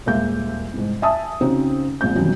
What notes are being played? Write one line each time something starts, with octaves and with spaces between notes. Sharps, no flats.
D#1 G#3 A#3 E5 G6
C2 G#2
E5 G#5 A5 D#6
C#3 C4 D#4 F#4
A#1 G#3 C4 G6
C2 F#2 B2 D#3 E3 F#3